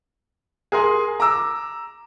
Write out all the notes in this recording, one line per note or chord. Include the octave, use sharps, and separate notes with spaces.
G#4 A#4 G#5 C6
A#5 D6 E6